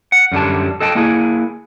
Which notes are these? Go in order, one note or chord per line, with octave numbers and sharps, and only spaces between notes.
F#5
F#2 D3 G3 A5
A4 D#5 G5 A5
A#3 E4 G#4